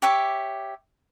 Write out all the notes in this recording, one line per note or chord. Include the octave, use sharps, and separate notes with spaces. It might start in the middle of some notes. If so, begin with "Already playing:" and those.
G4 C#5 E5 D6